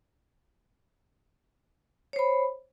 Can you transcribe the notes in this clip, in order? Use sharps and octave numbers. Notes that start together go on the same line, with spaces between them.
C5 C#5 B5